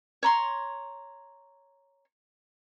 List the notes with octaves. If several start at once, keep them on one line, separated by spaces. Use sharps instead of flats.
C#5 A#5 C6